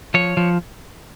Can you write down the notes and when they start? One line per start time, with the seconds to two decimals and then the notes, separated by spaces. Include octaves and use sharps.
0.14 F3 C#5
0.37 F3